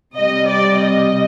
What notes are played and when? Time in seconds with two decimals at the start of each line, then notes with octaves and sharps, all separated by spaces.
0.15 C3 G3 D#5
0.47 D5
0.78 D#5